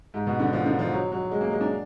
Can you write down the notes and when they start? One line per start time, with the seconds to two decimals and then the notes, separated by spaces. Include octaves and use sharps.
0.14 G#2
0.27 B2
0.40 D3
0.53 F3
0.66 D3
0.79 F3
0.92 F#3
1.12 F#3
1.31 G#3
1.41 A#3
1.51 G#3
1.61 D4